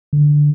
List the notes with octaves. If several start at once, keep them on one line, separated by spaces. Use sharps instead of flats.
D3